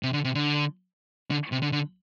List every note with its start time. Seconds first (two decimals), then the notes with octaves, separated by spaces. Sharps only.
0.03 C3
0.13 D3
0.24 C3
0.35 D3
1.31 D3
1.52 C3
1.62 D3
1.72 D3